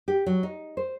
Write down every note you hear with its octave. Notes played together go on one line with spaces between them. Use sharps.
G4
F#3
D#4
C5